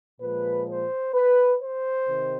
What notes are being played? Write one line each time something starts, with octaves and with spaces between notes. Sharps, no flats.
A#2 F3 G#3 B4
C5
B4
C5
C3 D#3